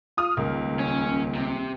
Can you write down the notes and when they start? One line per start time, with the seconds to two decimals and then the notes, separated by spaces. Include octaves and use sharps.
0.17 F4 D#6 F6
0.37 D#1 C#2 A#4
0.80 C#4
1.35 C3